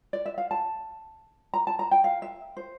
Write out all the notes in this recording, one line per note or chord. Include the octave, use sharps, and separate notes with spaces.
D5
E5
F5
A5
A#5
A5
A#5
G5
F5
E5
C5